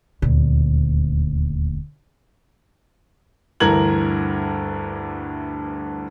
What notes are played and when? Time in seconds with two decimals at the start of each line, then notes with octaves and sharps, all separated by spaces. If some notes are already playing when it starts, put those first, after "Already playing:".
0.22 D#1 D2
3.60 D2 G2 E3 A#4 G#6 F#7